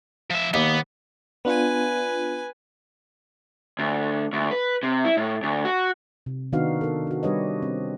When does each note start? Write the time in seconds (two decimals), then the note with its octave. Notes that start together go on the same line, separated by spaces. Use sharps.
0.30 F3 E5
0.54 D#2 B3
1.45 B3 D4 F4 B4 G#5
3.79 D2
4.33 D2
4.51 B4
4.83 C3
5.05 E4
5.17 A2
5.43 D2
5.65 F#4
6.26 C3
6.53 D#3 B3 D4 D#4 F#4 F5
6.81 A4 A#4
7.07 D4 F#4
7.23 G3 D4 G4 B4 C#5 D#5
7.62 C4